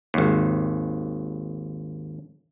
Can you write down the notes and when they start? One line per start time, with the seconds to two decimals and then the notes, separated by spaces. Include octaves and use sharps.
0.14 G#1 D#2